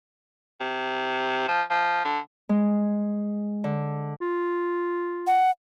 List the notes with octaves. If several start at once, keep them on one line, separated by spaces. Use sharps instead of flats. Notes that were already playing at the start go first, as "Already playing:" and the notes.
C3
F3
F3
D3
G#3
D3
F4
F#5